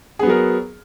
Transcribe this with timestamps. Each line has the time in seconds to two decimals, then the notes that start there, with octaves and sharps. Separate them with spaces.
0.19 G#4
0.23 B3
0.26 F#3
0.30 A#4